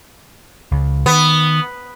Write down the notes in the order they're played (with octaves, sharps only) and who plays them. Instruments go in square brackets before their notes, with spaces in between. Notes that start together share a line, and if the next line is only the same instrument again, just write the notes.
[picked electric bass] C#2
[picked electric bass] D#3 [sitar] B3